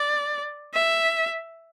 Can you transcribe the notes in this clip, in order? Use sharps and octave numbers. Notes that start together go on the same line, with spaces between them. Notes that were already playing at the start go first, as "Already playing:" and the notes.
Already playing: D5
E5